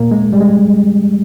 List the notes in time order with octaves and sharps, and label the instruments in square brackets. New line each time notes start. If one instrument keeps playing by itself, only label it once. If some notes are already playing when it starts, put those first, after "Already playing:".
Already playing: [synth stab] A#2 A#3
[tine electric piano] G#3
G3
G#3